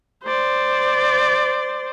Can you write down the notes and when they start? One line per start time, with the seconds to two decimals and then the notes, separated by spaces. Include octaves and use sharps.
0.24 C5 D5